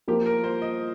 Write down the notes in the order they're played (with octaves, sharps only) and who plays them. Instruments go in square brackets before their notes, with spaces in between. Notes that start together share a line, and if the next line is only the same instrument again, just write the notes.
[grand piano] F3 A#3 F4 [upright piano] G4
[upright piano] A#4
C5
D#5